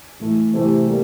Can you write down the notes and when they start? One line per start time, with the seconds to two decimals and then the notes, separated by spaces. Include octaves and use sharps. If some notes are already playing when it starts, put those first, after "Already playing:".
0.20 A2 E3 A3
0.53 C3 E3 A3 C4 G4
0.87 G3 A#3